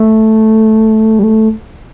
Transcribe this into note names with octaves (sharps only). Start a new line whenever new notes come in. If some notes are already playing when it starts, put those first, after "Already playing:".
Already playing: A3
G3
A3